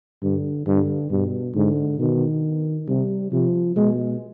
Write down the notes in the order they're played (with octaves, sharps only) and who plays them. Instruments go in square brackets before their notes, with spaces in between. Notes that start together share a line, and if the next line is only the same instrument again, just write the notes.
[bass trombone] G2 [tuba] D3
[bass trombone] G2 [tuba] D3
[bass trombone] G2 [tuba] B2
[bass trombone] G#2 [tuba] D3
[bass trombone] B2 [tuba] D#3
[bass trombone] C3 [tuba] G3
[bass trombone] C3 [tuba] F3
[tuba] B2 [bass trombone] G#3